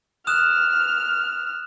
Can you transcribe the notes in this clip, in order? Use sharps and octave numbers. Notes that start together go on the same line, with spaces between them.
D#6 F6 F#6 E7